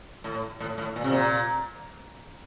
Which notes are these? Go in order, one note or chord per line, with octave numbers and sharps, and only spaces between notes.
A2
A2
A2
A#2
C3
A#2